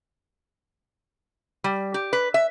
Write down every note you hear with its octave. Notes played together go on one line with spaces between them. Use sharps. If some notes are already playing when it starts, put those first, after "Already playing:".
G3
G4
B4
E5